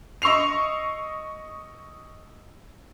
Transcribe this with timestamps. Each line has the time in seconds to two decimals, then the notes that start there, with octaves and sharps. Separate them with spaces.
0.22 D#5 C#6 E6 C7 F7